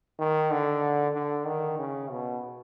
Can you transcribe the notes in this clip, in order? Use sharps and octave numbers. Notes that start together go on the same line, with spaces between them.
D#3
D3
D3
D#3
C#3
B2